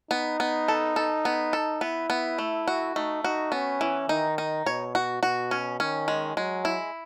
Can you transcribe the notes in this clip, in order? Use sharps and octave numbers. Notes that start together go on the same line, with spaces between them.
B3 D#4
B3
A4
A4
B3
A4
B3 E4
B3
A3
F#4
A3 D#4
D#4 F#4
B3 C#4
E3
D#3 D#4
D#4
B2 C#5
F#4
B2 F#4
C#4
D#3 C#4
G#3
F#3 G#3
E4